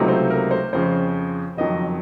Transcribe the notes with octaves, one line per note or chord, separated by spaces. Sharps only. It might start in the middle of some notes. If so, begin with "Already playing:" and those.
Already playing: C#2 C3 F#3 A3 D#4
C5
A#4
C5
F2 C#3 F3 C5
F#1 F2 D#3 F#3 D#5